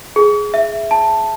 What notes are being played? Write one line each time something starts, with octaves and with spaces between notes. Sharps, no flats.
G#4
E5
A5